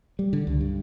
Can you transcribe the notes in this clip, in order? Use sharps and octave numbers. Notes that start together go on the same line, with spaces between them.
G3
D3
C#2
G2